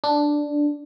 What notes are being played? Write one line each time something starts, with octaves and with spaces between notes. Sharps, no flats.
D4